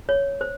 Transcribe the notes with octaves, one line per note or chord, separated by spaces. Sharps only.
C#5
C5